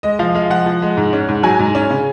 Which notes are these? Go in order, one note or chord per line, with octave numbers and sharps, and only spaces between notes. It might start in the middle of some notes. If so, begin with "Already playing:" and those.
G#3 D#5
F3 F5
G#3 F5
F3 F#5
F3
G#3
G#2
C#4
G#2
F#3 G#5
G#2
C#4
C#3